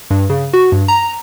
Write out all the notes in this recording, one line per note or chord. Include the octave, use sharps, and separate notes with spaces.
G2
C#3
F#4
G2
A#5